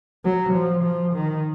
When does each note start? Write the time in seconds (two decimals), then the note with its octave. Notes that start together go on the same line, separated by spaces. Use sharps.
0.24 F#3
0.54 F3
0.84 F3
1.14 D#3